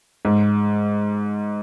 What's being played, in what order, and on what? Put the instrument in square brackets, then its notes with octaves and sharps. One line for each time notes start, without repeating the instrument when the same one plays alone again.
[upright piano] G#2